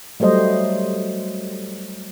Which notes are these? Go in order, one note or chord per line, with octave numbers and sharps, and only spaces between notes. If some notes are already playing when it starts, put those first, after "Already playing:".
F#3 G3 A3 C5 D#5